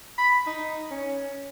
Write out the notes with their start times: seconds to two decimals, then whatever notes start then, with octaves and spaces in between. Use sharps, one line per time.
0.18 B5
0.47 D#4
0.91 C#4